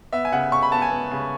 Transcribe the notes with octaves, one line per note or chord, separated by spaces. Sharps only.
B3 E5
G#5
C#3 F#5
C#3 C#6
B5
B3 A5
G#5
B3
C#3